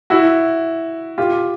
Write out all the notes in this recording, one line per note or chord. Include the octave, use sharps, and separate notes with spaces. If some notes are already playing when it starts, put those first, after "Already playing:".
E4 F#4
F4 G4